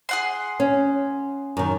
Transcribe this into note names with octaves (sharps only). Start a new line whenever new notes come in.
G#4 F#5 C6
C#4
F#2 D#3